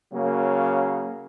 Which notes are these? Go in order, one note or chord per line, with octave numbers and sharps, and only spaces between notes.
C#3 F#3 A#3